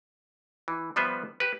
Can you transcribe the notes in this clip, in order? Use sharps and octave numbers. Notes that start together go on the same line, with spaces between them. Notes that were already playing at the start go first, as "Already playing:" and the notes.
E3
F3 G3 B3 B4 C5 E5
G4 B4